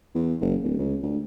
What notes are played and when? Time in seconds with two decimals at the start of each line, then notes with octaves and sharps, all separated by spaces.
0.15 E2
0.41 F#1
0.63 D1
0.78 C#2
1.03 D2